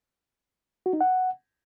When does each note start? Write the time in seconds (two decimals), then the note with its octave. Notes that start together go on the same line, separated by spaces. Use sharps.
0.86 F#4
0.93 D#4
1.01 F#5